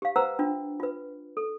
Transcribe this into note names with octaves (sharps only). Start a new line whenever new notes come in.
G4 F5
B4 C5 F#5 A#5 E6
D4 F4
F4 B4
A4